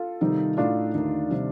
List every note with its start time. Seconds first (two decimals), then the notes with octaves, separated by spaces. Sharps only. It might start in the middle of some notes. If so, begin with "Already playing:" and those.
Already playing: F4 A4
0.21 C3 D#3 G3 C4 D#4
0.57 A2 A3 D4 D#4 F4
0.94 D#2 D3 A3 D#4
1.30 C3 D#3 G3